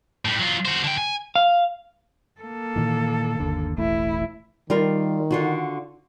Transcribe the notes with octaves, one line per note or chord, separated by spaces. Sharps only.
A2 G3
F#3 F4
F#4 C5
D3 G5
G#5
F5
A#3 A4
A#2 D#3 E3
G1 D#2 D3
E1 A1 A3 E4
D#3 G3 F4 A#4
D3 F4 F#4